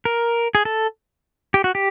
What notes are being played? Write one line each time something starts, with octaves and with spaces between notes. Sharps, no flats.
A#4
G#4
A4
G4
F#4
G4